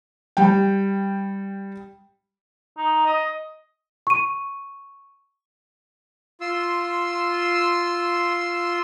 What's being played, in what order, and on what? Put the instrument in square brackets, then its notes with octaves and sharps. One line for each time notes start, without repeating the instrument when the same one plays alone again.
[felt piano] G3 G5
[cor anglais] D#4
D#5
[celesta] C#6 D#7
[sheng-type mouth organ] F4 C6 E6